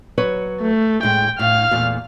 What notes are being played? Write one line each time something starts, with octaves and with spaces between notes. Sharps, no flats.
F#3 B4 C#5
A3
A2 G#3 G5
A2 F5 F6
E2 A#2 A3